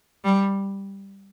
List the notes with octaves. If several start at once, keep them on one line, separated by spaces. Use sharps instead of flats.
G3